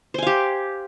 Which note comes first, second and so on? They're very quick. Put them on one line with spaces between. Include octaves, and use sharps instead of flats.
C5 G#5 F5 G4